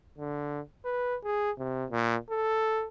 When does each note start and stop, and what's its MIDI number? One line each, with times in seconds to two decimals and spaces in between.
0.18 0.61 50
0.85 1.16 71
1.24 1.51 68
1.58 1.85 48
1.90 2.16 46
2.30 2.86 69